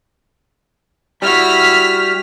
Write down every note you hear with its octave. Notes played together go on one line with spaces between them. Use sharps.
G3 E4 F#4 F6 B6